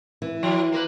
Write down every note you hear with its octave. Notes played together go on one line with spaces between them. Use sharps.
E3
F3
A#3 A#4 B4